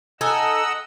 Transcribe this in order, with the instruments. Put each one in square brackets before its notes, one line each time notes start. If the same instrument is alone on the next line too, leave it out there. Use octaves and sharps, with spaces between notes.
[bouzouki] D#4 A4 G#5 [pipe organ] D#5 F#5 E6